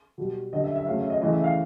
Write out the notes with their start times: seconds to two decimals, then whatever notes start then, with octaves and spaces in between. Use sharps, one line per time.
0.18 B2 G3
0.53 D3 G3 D#5
0.64 E5
0.76 E5
0.86 C#3 F#3 A3 F5
0.98 E5
1.10 D#5
1.21 C#3 E3 A3 D#5
1.33 E5
1.44 F5